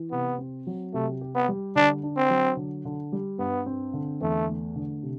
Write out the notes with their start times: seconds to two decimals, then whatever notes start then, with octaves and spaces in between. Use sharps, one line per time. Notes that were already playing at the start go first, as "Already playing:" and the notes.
Already playing: E3
0.11 C3 B3
0.38 C4
0.67 F#3
0.94 C3 A3
1.21 G4
1.35 B3
1.49 G3
1.76 D3 D4
2.03 D4
2.17 C4
2.30 F#3
2.57 D3
2.85 D3
3.12 G3
3.39 G2 B3
3.66 C4
3.94 D3
4.21 E2 A3
4.48 A3
4.76 D3
5.03 C3